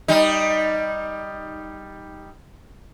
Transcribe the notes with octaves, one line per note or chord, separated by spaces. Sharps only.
G3 D#4